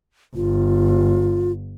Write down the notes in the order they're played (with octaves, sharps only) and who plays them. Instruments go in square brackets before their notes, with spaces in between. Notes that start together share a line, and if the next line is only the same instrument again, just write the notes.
[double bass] G1 [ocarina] F4